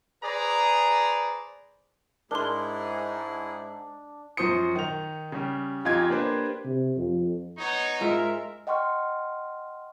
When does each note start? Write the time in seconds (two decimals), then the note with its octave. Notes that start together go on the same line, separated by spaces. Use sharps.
0.24 G#4 B4 C5 D5 A#5
2.31 G#2 D4 E4 G#4 A#4 C6
4.37 F#2 F3 C5 C6 D#6 C#7
4.75 D#3 F7
5.32 C#3 G3
5.85 F2 D#4 F4 G4 G#5 G#6
6.09 A#3 D4 G4 B4 C5
6.64 C3
6.97 F2
7.58 B3 D#4 C#5
8.01 G#2 G#3 F4 A#4 E5
8.67 D#5 F#5 G5 C6 C#6 F6